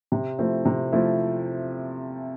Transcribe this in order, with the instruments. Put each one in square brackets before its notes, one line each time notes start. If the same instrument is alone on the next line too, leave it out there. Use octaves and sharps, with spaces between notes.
[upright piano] C3
F3 A3 C4 E4
C3
F3 A3 C4 E4